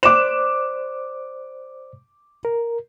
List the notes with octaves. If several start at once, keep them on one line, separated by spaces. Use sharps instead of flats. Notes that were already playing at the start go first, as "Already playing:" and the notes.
C5 D5 D6 F#6 E7
A#4